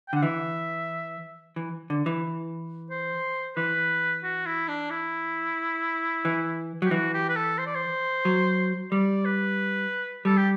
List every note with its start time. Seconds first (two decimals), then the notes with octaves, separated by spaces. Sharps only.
0.08 G5
0.13 D3 F#5
0.23 E3 E5
1.56 E3
1.90 D3
2.06 E3
2.90 C5
3.57 E3 B4
4.24 F#4
4.46 E4
4.69 D4
4.91 E4
6.25 E3
6.82 F#3 G4
6.91 E3 F#4
7.14 G4
7.29 B4
7.36 A4
7.58 C5
7.66 D5
7.75 C5
8.25 F#3
8.92 G3 D5
9.25 B4
10.25 G3 A4
10.37 G4